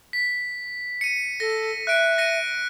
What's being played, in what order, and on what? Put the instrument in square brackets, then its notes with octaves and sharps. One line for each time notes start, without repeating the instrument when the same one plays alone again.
[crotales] B6
C#7 D#7
[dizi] A4 [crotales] A#6
[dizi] E5 [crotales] F#6 D7
[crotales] A#6 C#7 D#7